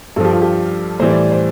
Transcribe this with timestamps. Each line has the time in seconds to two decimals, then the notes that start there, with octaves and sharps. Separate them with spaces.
0.16 G2 A4
0.20 F3 G4
0.33 F4
0.42 G4
0.99 A2 E3 G3 C5
1.10 D5
1.32 C5